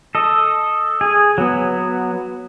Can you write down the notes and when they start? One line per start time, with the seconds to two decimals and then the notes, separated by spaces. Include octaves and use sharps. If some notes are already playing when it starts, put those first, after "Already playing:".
0.15 A4 D#5
1.01 G#4
1.38 F#3 B3